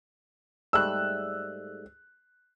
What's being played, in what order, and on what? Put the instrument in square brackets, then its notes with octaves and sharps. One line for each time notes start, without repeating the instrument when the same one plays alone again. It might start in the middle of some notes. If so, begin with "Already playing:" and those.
[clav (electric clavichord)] G#2 G3 A3 [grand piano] E6 F#6